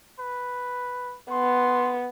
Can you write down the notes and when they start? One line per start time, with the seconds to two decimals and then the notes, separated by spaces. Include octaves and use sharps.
0.20 B4
1.31 B3 C6